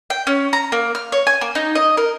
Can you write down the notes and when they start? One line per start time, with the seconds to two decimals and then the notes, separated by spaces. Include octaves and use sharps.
0.10 G5
0.27 C#4
0.53 A#5
0.72 A#3
0.95 F6
1.12 C#5
1.27 G#5
1.41 A#3
1.55 D#4
1.75 D#5
1.97 A#4